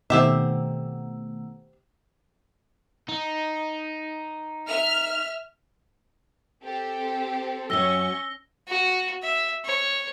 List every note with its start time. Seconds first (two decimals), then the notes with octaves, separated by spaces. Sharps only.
0.10 B2 D#3 A3 C4 G4 E5
3.09 D#4
4.68 E5 F6
6.63 C4 G4 A4
7.70 F#2 F#3 C#4 C#6 E6 A#6 G7
8.68 F#4
9.22 E5
9.65 C#5